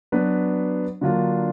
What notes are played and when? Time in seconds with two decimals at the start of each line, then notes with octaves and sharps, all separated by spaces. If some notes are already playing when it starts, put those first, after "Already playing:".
0.12 F#3 B3 D4 F#4 B4
1.01 D3 F#3 A#3 D4 F4